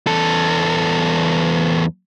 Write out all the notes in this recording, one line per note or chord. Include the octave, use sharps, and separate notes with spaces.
E2 A4